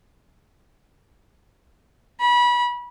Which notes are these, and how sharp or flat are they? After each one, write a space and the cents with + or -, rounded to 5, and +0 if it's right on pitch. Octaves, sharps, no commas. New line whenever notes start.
B5 -25